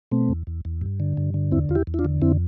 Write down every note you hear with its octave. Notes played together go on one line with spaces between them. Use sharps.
B2 A3 C4
E2
E2
E2
G2
D3
G2
D3
E2 C4 E4
E2 F4
E4 G4
E2
E4
D4 F4
D3
F2 C4 E4